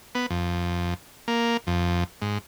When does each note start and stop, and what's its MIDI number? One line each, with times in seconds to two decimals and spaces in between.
0.15 0.26 59
0.30 0.94 41
1.28 1.57 58
1.67 2.04 41
2.22 2.38 44